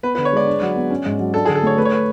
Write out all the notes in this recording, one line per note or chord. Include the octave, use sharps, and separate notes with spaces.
B3 B4
D3 B4
C#5
G#3 D5
D4
F#3
B3
C#4
G#2
F#3
D4 A4
D3 G#4
A4
A3 C#5
A3 B4
C#5
B4